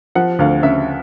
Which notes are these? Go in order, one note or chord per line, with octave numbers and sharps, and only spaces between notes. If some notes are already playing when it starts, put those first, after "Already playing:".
F3 F#5
D2 F5
C#3 E5